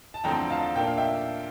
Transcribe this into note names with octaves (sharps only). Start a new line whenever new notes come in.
A5
E2 D3 F3 A3 C4 G5 A#5
F5 A5
A#2 A3 D4 G5
F5
E5 G5